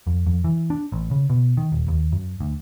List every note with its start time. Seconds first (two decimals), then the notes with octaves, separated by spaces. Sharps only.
0.07 F2
0.26 F2
0.44 E3
0.70 D4
0.92 A1
1.11 C#3
1.30 B2
1.57 D#3
1.72 D#1
1.88 D#2
2.12 F#2
2.41 D2